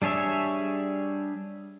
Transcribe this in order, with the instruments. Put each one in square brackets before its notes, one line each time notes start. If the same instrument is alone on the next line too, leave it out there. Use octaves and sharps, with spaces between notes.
[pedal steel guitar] G3 D4 G#4 C#5 E5